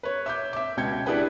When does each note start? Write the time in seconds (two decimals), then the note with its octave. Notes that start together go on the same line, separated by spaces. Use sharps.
0.03 B4 C#5
0.26 E5 D6 G6
0.53 E5 D6
0.77 C#2 B2 G5 G6 G#6 C#7
1.06 D4 E4 G4 G#4 B4 G5